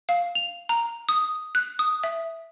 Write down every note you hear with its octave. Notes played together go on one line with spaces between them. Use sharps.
F5
F7
A#5
D#6
F#6
D#6
E5